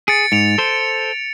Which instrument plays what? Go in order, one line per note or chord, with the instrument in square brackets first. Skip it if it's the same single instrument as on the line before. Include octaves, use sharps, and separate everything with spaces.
[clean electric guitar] G#4 [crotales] A6 C#7 D7
[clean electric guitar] G#2 [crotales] C#7 D7 F7
[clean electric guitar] A4 C5